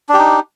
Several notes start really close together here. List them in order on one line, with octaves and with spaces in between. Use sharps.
D4 G4 D#4